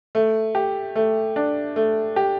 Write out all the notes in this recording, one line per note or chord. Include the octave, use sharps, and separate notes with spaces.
A3
G4
A3
D4
A3
G4